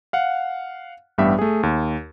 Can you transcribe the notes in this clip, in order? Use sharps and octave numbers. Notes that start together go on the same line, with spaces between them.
F5 F#5
A1 G2 G3 B3 G4 E5
A3 G#4
D#2